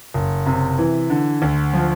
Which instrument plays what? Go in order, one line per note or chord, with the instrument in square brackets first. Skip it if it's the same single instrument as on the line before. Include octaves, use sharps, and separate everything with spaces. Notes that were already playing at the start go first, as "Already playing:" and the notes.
[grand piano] F#1
C3
E3
D3
D2
F3